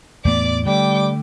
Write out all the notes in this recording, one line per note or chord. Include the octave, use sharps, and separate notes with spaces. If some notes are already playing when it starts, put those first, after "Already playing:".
E2 A2 B3 D5 D6
D3 G3 A3 G5 D6